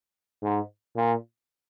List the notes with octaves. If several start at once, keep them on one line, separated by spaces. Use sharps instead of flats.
G#2
A#2